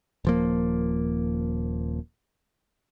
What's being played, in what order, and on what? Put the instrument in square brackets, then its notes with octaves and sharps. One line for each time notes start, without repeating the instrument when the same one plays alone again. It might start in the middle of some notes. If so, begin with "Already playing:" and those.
[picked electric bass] D#1 F3 A#3